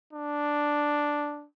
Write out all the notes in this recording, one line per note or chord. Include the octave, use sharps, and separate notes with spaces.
D4